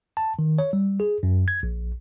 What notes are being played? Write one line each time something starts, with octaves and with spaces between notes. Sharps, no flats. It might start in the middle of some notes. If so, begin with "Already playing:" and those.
A5
D#3
C#5
G3
G#4
F#2
G#6
A#1